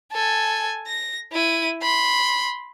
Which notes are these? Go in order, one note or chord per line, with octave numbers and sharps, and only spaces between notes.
A4 G#5
A#6
E4 D#7
B5 C6